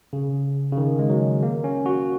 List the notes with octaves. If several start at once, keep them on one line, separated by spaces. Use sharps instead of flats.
C#3
C#3
D#3
G#3
F#3
A#3
C#4
F#4